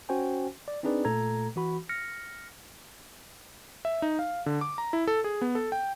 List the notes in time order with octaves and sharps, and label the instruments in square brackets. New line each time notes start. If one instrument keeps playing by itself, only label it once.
[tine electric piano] C#4 F#4 C5 G5 G#5
D5
C4 D4 D#4 G#4 B4 D5
A#2 A3 A4 A#5 G#6
E3 F#4 B5
F6 A#6 C#7
[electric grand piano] E5
D#4
F5
D3
D6
A#5
E4
A4
G#4
B3
A4
G5